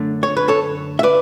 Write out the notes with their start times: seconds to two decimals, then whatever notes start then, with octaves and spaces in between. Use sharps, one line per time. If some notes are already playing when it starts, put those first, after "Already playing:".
Already playing: F#2 D3 A3
0.23 C#5
0.37 B4
0.48 A4 C#5
0.99 E5
1.03 B4 D5